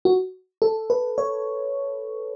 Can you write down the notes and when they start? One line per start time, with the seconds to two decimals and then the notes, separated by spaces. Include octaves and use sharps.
0.05 F#4
0.62 A4
0.90 B4
1.18 C#5